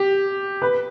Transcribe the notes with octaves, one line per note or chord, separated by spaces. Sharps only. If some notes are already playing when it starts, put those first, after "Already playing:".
Already playing: G4
B4